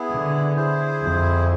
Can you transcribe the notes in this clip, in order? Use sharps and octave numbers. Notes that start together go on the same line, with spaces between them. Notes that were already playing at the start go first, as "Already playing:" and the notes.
Already playing: B3 E4 G#4
D3
E4 G#4 C5
F2